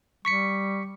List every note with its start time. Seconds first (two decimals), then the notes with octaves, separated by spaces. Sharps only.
0.25 G3 C#6 B6 C#7